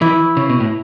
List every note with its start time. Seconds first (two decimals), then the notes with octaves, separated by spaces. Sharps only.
0.01 E3 E4
0.37 C#3
0.50 B2
0.60 A2